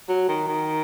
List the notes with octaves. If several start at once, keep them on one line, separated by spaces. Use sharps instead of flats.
F#3
D#3
D#3